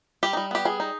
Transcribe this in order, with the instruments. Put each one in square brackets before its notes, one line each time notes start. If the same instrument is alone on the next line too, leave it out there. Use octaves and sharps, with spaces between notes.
[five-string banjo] G3 G4
G3 D#4
B3 G4
G3 G#4
D#4